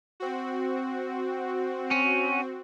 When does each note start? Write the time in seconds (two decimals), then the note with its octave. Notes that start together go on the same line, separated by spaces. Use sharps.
0.20 C4 F#4
1.91 C#4